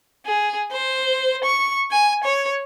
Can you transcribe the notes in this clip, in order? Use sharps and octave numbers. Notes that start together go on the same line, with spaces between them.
G#4
C5
C#6
G#5
C#5